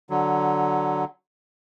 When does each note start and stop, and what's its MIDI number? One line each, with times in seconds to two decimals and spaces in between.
0.10 1.04 50
0.10 1.04 54